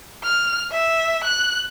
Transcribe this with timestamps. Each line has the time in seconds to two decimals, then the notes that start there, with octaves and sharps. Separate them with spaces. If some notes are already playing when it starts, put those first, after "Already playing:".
0.24 F6
0.72 E5
1.24 F#6